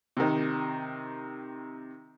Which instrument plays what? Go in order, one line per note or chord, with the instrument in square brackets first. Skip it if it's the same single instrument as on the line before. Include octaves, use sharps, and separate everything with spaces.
[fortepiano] C3 D#3